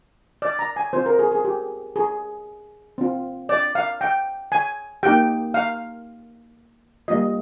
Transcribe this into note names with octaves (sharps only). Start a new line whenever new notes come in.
D5
A#5
G#5
C4 F4 C5
A#4
G#4
G#4
G4
G#4
C4 F4
D5
F5
G5
G#5
A#3 D#4 G4 G5
F5
G3 A#3 F4 D#5